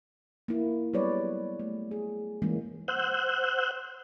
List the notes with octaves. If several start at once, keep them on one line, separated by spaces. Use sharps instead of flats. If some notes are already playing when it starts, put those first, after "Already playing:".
A#3 E4
F#3 G3 B3 B4 C#5 D5
A3
G#4
E3 G3 G#3 A#3 C#4
C5 F#5 E6 F#6 G6